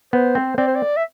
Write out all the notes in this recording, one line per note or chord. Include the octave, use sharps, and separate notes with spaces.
B3 C5
C4
C4 D5
C5
D5
E5